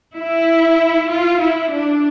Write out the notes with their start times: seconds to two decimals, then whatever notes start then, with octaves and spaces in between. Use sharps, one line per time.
0.16 E4
1.10 F4
1.41 E4
1.72 D4